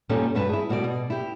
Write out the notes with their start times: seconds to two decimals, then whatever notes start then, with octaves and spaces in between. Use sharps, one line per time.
0.09 G2 A#2 D#3 G3 C#4 A4
0.35 D2 G2 B4 A5
0.49 E4 G#4
0.69 D2 B2 G3 G4 D5
0.84 B2
1.10 E4 G4